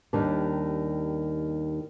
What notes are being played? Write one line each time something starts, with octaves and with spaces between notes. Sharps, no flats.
D#2 D#3 G3 D4